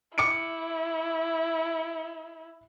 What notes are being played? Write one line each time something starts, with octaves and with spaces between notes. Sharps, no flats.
E4 D6 C#7 D7